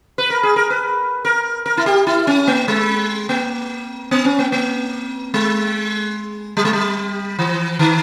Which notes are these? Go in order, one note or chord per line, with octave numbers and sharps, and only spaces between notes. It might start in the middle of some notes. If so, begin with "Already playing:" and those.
B4
A#4
G#4
A#4
B4
A#4
A#4
E4
G4
E4
C#4
A#3
G#3
A#3
B3
C#4
A#3
A#3
G#3
G3
G#3
G3
E3
D#3